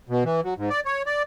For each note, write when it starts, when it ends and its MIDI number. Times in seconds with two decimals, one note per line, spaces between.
0.09 0.24 47
0.25 0.41 52
0.44 0.54 54
0.57 0.69 44
0.70 0.80 74
0.85 1.02 73
1.06 1.22 74